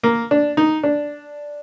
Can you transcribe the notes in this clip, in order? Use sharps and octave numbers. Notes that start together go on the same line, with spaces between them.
A#3
D4
D#4
D4